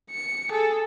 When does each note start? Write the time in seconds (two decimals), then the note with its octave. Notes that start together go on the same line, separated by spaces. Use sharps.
0.10 C#7
0.50 G#4 A4